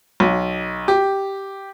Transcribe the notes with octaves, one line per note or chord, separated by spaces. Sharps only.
B1
G4